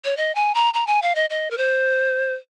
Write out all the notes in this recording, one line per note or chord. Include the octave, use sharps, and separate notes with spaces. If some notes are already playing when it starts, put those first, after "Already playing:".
C#5
D#5
G#5
A#5
A#5
G#5
F5
D#5
D#5
A#4
C5